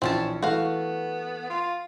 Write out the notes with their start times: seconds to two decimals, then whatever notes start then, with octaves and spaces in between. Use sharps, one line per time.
0.02 A#1 E3 C4 C#4 A5
0.42 E3 A3 B3 F#4 F5
1.50 F4